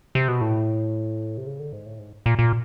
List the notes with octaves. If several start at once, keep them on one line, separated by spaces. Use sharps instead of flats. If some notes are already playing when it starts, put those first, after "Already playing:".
C3
B2
A2
C3
C#3
D3
G#2
A2
G#2
A#2
A#2